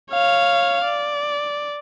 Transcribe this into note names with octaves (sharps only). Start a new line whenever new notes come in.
C#5 F5
D5